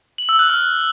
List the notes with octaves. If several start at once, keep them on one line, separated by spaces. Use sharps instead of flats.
F#7
E6
F#6
F6